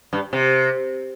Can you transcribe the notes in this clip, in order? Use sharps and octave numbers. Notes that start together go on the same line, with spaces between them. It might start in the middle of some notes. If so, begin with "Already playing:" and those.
G2
C3